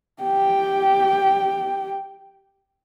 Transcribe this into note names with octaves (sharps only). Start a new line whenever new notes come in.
G4 G5